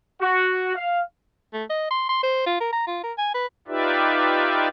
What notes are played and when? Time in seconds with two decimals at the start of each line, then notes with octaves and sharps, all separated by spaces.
0.20 F#4
0.75 F5
1.53 A3
1.70 D#5
1.91 C6
2.09 C6
2.23 C5
2.46 F4
2.60 A#4
2.72 A#5
2.87 F4
3.03 A#4
3.18 G#5
3.34 B4
3.68 D#4 F4 G4 B4 D5 E5